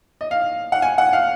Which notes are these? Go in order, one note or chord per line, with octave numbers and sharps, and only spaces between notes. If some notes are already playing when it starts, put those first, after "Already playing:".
D#5
F5
F#5
G#5
F#5
F5